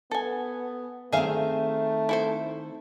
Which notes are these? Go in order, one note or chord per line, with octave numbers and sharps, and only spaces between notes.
B3 A4 G#5
D#3 A3 C4 G#4 E5 F5
E4 A4 C5